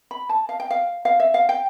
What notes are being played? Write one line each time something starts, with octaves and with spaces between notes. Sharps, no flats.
B5
A5
F5
G5
F5
F5
E5
F5
G5